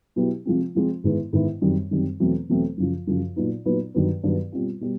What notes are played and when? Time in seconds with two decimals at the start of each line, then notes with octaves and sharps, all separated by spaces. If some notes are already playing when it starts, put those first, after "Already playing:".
0.16 B2 F#3 B3 E4 G4
0.45 C3 F3 G#3 C4
0.75 C3 F3 G#3 C4
1.04 G#2 D#3 G#3 B3 E4
1.33 G#2 D#3 G#3 B3 E4
1.62 F#2 D#3 G3 C4
1.91 F#2 D#3 G3 C4
2.20 E2 B2 F#3 A3 C4
2.49 E2 B2 F#3 A3 C4
2.77 F#2 C#3 F3
3.07 F#2 C#3 F3
3.36 A#2 F#3 B3 D#4
3.65 A#2 F#3 B3 D#4
3.94 G2 D#3 F#3 B3
4.23 G2 D#3 F#3 B3
4.52 B2 G3 C4 F4
4.81 B2 G3